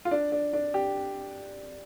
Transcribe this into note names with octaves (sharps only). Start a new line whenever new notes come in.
F4
D4
D4
D4
G4